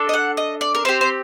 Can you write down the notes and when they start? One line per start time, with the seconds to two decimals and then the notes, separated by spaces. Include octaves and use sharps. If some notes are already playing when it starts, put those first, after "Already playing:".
Already playing: D4 A4
0.09 D#5
0.14 F#5
0.37 D#5
0.61 D5
0.75 A#4
0.85 C4 G4 C5
1.01 C5